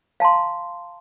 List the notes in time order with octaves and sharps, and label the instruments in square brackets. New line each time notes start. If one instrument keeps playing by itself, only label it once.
[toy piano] F5 A5 A#5 C6